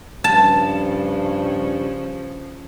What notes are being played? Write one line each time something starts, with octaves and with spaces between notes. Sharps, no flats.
G2 C#3 F3 A5